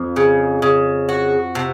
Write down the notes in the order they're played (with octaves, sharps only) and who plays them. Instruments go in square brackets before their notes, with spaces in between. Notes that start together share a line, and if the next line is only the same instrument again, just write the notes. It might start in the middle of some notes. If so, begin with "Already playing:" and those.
Already playing: [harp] F2
[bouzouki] C#3
C#3
F#4
C3